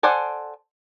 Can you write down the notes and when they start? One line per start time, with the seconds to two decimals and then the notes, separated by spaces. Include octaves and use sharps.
0.03 A4 C5 D5 F#5 G#5